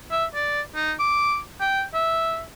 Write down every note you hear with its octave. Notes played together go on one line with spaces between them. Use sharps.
E5
D5
D#4
D6
G5
E5